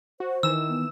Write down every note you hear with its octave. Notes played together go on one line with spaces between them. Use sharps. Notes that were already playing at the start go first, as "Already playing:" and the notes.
F#4 C5
D#3 E3 E6 E7
B3